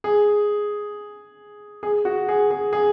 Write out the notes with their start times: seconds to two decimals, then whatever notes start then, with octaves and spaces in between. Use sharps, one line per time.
0.04 G#4
1.83 G#4
2.05 F#4
2.29 G#4
2.51 G#4
2.73 G#4